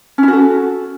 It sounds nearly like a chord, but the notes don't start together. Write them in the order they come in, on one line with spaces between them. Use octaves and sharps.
C#4 E4 F#4 A4